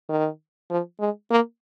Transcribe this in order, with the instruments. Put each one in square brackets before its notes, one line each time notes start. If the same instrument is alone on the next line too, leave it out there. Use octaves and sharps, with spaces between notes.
[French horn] D#3
F3
G#3
A#3